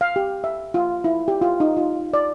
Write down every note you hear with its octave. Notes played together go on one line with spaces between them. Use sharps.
F5
G4
E5
F4
E4
G4
F4
D#4
F4
D5